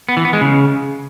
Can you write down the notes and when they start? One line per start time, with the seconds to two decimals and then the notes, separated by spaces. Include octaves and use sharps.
0.09 B3
0.17 E3
0.25 B3
0.33 G#3
0.41 C#3